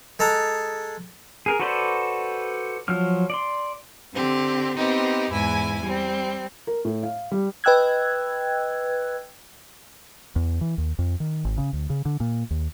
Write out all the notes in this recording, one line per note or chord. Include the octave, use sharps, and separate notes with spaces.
G#3 A4 A#5
G#4 A#4
F#4 A4 B4 C5 D5
F3 F#3 F6
D5 C6
D3 C4 G4
B3 C4 D#4 G4
E2 G#2 E4 G#5
G3 C4
A#4
A2
F5
G3
B4 D#5 G5 E6 F#6 G#6
E2
E3
D#2
F2
D#3
G#1
C#3
D2
C#3
D3
A#2
D#2